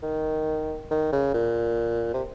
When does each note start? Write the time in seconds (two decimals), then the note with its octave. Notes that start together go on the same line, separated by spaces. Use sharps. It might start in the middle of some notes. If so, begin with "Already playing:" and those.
0.03 D#3
0.91 D#3
1.12 C#3
1.34 A#2
2.14 C3